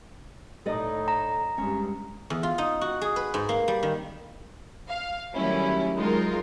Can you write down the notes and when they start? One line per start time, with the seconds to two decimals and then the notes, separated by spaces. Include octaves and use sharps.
0.66 A2 D#4 A4 D5 D#5
1.08 A#5
1.58 G2 G#3 C#4
2.30 E2
2.43 F4
2.58 D#4
2.81 F#4
3.01 G#4
3.16 B4
3.34 G#2
3.49 A#3
3.68 G3
3.83 D#3
4.88 F5
5.35 D#3 F#3 G3 A3 C#4 E4
5.96 F#3 G#3 D#4 F4 A#4